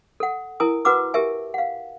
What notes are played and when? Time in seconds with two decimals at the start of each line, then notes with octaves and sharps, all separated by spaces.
0.20 A4 F#5
0.60 E4 A#4 G#5 D#6
0.85 F#4 B4 F#5 A#5 D6 E6
1.14 G4 A#4 E5 G#5
1.54 F5 F#5